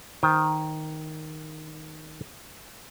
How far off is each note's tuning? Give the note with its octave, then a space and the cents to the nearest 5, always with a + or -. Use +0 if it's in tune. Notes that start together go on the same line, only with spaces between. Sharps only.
D#3 +0 C5 -15 G5 +40